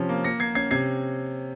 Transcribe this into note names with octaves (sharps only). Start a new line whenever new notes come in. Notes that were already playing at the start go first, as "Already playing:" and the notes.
Already playing: C3 F3 C#4
A#3
A#3 A#6 C#7
A#3 G#6 C7
C#4 G#6 C7
C3 G#6 C7